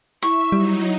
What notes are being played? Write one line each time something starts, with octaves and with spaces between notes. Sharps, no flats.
E4 E5 C#6
F#3 G3 D#4